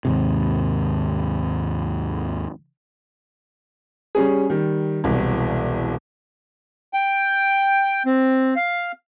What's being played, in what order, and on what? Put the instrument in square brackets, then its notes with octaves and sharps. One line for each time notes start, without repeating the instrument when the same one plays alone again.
[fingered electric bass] D#2 G#2 C3
[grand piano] G3 C#4 G#4
D#3 G3
E1 C2
[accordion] G5
C4
F5